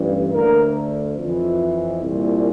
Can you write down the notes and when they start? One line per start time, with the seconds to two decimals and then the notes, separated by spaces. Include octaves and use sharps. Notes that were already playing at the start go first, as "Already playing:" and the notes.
Already playing: A1 G2 E3
0.33 D2 D3 A#3 A#4
1.18 F2 E3
2.03 C2
2.08 A#2